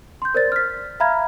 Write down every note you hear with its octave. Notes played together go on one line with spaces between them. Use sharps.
C6 G6
A#4 C5 D5 A6
F6 B6
E5 F5 A#5 B5 F6 G#6